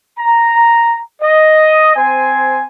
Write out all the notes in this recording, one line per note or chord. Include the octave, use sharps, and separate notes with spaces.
A#5
D#5
C4 C5 G#5